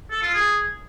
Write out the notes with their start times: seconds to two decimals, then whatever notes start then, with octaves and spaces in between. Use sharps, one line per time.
0.11 A4
0.22 F4
0.34 G#4